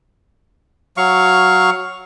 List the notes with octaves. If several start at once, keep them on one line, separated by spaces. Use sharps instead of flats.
F#3 F5 C#6